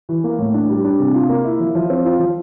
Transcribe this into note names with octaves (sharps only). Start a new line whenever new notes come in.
E3
A#3
A2
D4
G3
D4
C3
F4
A#3
E4
F3
F3
C4
F4
F3